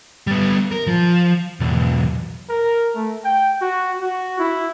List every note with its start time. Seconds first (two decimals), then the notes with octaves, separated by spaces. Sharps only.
0.27 G3 B3
0.71 A#4
0.87 F3
1.60 B1 E2
2.49 A#4
2.95 A3
3.24 G5
3.61 F#4
4.01 F#4
4.39 E4